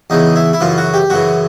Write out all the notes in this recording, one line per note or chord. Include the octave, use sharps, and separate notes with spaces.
E2 C#3 E3 D#4
E4
E4
F#2 C#3 E3 F4
F#4
G4
F#2 C#3 E3 F#4